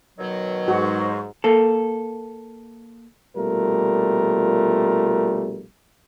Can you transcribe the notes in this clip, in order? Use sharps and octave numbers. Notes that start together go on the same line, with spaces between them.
B2 D#3 F#3
G#2 F#4 C5 D#5 C#6
A#3 A4
A#1 B2 G3 A3 F4 A#4